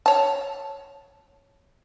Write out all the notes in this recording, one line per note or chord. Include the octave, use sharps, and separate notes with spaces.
C#5 A5